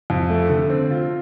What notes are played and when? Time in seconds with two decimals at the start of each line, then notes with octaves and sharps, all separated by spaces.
0.10 F2
0.30 A3
0.49 D3
0.70 C4
0.91 F4